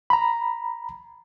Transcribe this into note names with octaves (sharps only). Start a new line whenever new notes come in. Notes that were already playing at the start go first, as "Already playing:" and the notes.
A#5 B5